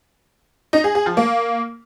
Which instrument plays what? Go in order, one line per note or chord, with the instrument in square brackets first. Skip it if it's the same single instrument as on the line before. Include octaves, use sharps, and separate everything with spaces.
[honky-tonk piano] D#4
G#4
G#4
F3
A#3